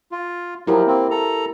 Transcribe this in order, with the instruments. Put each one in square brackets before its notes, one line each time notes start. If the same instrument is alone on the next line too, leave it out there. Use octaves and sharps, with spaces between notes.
[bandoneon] F4
[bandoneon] F3 F#3 [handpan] E4 G4 A#4
[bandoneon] A#3 C4
A4 A#5